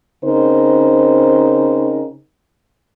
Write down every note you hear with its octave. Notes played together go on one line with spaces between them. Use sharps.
C#3 C4 D#4 A#4 C5